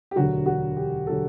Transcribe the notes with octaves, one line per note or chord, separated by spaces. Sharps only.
G4
E1 D2 D3 F#3 F#4
F#4
G4
D3 F#3 A4